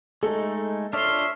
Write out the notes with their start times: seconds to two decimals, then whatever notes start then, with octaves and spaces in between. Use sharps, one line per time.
0.23 G#3 A3 D#4 A4
0.93 D4 F4 C#5 E5 C6 F6